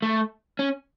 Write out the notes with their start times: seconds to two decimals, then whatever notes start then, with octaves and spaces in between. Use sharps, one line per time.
0.02 A3
0.59 C#4